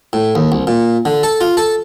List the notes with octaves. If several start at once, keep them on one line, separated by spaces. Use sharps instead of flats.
A2
D#2
C2
A#2
D3
A4
F4
A4